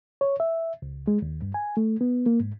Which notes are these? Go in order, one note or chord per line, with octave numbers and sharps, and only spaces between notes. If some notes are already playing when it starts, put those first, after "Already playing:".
C#5
E5
C#2
G#3
D#2
G2
G#5
A3
B3
A#3
G#2